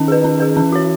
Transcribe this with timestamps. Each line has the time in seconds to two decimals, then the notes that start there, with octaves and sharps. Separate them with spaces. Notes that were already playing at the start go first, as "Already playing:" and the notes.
Already playing: D#3 C#4
0.08 G#4 B4
0.24 C#4
0.40 G#4 B4
0.57 E3 C#4
0.72 F#4 C#5